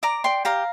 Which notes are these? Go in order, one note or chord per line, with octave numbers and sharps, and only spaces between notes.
D5 A#5 D6
D5 G5 C6
G4 F5 A#5